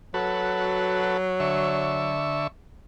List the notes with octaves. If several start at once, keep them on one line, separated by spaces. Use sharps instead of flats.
F#3 F#4 A4 B4
D3 E5 C#6